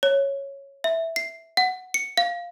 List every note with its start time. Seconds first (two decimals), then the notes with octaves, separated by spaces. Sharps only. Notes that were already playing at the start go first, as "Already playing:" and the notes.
0.03 C#5
0.84 E5
1.16 C7
1.57 F#5
1.94 C#7
2.17 F5